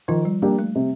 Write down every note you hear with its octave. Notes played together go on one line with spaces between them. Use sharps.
D#3 F3 F4
G3
G3 A#3 D4 G4
A3
C3